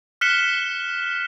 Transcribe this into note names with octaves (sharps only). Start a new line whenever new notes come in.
F6 F#6 B6 C#7 E7 G7